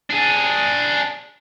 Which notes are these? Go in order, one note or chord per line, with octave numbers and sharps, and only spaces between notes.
D4 G#4